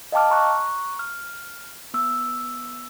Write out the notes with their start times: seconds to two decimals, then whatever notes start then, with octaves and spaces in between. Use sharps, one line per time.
0.12 D#5 F5 G5 A5 D6 F6
0.30 A#5 C#6 F#6
0.99 F6
1.94 B3 E6